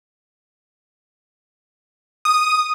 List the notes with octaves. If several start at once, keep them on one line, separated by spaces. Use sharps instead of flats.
D#6